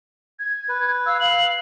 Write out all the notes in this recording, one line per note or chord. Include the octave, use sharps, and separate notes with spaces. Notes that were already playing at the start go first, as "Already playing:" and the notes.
G#6
B4
F5 E6
F5 F#7